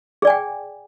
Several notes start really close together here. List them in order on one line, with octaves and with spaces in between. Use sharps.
G#4 D5 G#5 G5